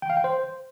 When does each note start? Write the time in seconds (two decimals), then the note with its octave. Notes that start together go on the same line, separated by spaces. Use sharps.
0.02 G5
0.10 F5
0.17 G5
0.24 C5